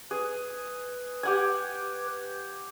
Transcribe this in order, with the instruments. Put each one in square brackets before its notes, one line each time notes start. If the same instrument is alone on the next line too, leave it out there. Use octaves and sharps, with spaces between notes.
[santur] G#4 [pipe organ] B4
[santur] G4 F#5 G#5